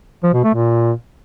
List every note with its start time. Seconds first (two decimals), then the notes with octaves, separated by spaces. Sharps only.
0.24 F3
0.34 B2
0.44 A3
0.55 A#2